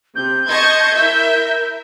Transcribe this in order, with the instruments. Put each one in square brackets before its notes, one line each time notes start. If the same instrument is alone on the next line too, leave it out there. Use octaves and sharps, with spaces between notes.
[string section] C3 [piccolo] G6
[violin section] D#5 G#6 [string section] A5 C6 C#6
[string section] E4 A#4 [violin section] E5